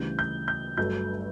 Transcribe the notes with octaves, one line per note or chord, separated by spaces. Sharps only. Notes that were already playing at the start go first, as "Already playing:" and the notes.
Already playing: D2 C#3 E3 G3 G6
G6
G6
G1 G2 F#3 A3 G6